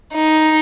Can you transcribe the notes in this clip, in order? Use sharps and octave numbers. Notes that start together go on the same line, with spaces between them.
D#4